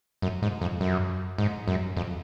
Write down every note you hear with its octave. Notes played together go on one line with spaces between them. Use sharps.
F#2
G#2
F2
F#2
G#2
F#2
F2